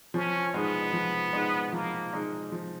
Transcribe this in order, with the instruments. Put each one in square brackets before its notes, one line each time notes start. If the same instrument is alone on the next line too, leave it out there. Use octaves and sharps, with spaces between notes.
[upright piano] F3 [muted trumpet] C#4
[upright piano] G#3 D#4 [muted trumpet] B3
[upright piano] F3
G#3 D#4
[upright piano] F3 [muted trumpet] A#3
[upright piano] G#3 D#4
F3